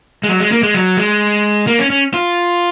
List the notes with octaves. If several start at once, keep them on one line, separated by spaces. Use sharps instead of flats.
G#3
F#3
G#3
A#3
G#3
F#3
G#3
A#3
C#4
C#4
F4